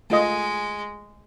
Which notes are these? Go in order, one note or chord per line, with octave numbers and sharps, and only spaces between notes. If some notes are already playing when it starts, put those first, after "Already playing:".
G#3 A3 F4 D#5